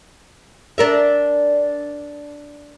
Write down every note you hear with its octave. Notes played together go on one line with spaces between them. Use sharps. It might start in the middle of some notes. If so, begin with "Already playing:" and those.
D4 A#4 E5